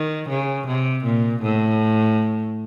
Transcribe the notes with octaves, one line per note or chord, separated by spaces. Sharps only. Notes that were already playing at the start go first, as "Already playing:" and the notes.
Already playing: D#3
C#3
C3
A#2
A2